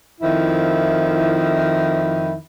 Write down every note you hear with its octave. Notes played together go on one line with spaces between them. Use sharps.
F2 D#3 F3 E4